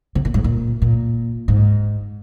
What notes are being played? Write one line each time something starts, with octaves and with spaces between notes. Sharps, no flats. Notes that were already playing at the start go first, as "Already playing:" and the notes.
C3
A#2
G#2
A#2
A#2
G#2